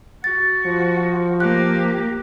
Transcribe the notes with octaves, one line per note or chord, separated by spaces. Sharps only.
F#4 A6
F3
A#3 G4 F#6